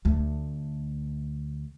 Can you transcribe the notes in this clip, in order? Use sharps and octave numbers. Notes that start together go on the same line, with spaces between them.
D2 A3